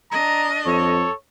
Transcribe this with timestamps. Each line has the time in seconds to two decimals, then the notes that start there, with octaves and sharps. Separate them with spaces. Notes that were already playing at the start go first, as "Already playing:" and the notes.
0.12 D4 D#5 A#5
0.66 F2 A4 C#5